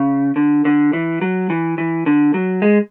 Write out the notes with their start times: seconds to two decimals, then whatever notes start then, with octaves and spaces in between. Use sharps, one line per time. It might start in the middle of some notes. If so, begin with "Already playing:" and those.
Already playing: C#3
0.36 D3
0.65 D3
0.93 E3
1.21 F#3
1.50 E3
1.78 E3
2.06 D3
2.34 F#3
2.62 G#3